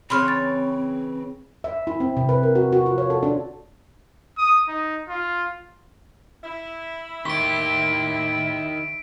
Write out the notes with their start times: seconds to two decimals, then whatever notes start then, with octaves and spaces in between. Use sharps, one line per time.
0.10 C#3 E3 C4 C#5 B5 C6 F6
0.28 A6
1.64 E5
1.87 E4
2.00 C4
2.17 C3
2.29 B4
2.43 A#4
2.55 F#4
2.73 F#4
2.86 F4
2.98 C#5
3.10 A4
3.23 D4
4.38 D#6
4.68 D#4
5.09 F4
6.44 E4
7.25 A2 D#3 G4 C6 B6 D7